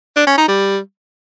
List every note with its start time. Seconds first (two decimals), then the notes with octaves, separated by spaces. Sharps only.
0.16 D4
0.27 C#4
0.37 D#4
0.48 G3